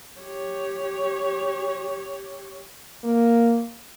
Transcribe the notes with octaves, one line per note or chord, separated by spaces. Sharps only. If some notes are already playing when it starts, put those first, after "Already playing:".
G4 C#5
A#3